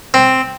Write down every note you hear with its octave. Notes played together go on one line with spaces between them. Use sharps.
C4